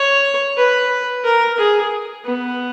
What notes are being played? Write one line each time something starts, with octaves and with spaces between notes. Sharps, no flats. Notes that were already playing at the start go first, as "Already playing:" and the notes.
Already playing: C#5
B4
A#4
G#4
B3